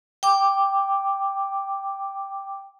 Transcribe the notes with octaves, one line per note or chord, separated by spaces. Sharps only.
G5 D6